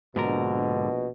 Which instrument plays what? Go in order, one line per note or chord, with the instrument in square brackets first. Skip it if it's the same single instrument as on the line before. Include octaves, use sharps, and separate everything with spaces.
[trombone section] A#1 B2 [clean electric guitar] G#2 D3 A#4